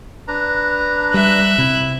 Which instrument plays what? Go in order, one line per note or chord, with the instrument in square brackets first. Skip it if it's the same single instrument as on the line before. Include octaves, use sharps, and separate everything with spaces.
[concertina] D4 B4 A#5
[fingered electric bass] G3 [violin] E5 F#6
[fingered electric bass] C3 [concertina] E4